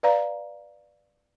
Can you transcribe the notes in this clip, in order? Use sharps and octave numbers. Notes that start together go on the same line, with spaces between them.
B4 D5 F5 A#5